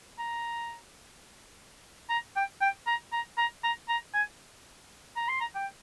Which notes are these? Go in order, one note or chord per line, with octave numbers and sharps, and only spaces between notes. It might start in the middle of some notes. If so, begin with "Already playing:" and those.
A#5
A#5
G5
G5
A#5
A#5
A#5
A#5
A#5
G#5
A#5
C6
A#5
G5